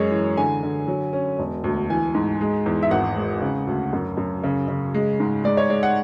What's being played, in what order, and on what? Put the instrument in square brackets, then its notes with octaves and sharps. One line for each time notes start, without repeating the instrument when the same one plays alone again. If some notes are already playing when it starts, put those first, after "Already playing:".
Already playing: [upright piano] F#2 G#3 C#5
E3
D3 G#5
D3
F#3
C#4
E1
D2
E3 G#5
G#2
G#3
E2
E5
G#1 F#5
G#3
C#3
D2
F#2
F#2
C#3
C#3
G#3
G#2
G#3 D5
C#5
G#3 D5
F#5